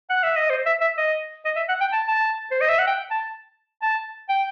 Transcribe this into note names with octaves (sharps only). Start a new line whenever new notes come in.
F#5
E5
D#5
C5
E5
E5
D#5
D#5
E5
F#5
G5
A5
A5
C5
D#5
E5
F#5
G5
A5
A5
G5